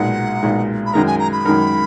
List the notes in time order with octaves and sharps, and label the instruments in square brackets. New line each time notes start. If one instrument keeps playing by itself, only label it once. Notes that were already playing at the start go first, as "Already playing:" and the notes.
Already playing: [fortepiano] B1 A#2 G#3 D#4 [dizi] F#5
[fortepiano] B1 A#2 G#3 D#4
[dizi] B5
[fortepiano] F#2 D#3 G#3 D#4 A#4 [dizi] A#5
[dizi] G#5
A#5
B5
[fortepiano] F#2 D#3 G#3 D#4 A#4